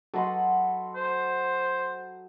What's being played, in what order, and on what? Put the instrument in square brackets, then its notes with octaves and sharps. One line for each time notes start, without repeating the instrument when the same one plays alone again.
[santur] F#3 B5 C6 [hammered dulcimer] A4 D#5 F#5
[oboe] C5